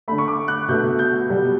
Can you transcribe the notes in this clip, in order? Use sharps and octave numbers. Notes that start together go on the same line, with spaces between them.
D3 A3 B5
C#6
D6
F#6
B2 A3 G6
G6
B2 G3